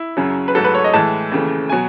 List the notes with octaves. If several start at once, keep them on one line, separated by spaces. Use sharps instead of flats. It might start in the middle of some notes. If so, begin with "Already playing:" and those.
Already playing: E4
F#2 C#3 F#3
B4
G#2 F#3 A3 A4
B4
C#5
D#5
A2 E3 G#3 A5
D#2 C#3 E3 A3
B2 F#3 G#5